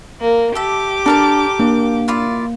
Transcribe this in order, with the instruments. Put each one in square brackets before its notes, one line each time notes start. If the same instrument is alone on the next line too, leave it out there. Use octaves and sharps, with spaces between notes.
[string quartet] A#3
[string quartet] G4 D6 [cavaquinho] A4 E5
[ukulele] D4 [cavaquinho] A4 A#4 A5
[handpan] A#3 [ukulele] D4
[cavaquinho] E4 F4 D5